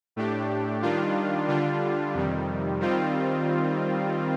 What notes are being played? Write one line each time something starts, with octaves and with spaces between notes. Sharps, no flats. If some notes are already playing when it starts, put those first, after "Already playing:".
A2 A3 D4 G4
D#3 G3 D4 F4
D3 G3 D4 F4
F2 C3 D#3 G3
D#3 G3 C4 F4